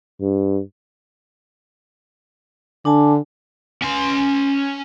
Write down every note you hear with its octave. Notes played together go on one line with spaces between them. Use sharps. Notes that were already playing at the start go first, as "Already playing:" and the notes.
G2
D3 D4 G#5 A5
C#4 C6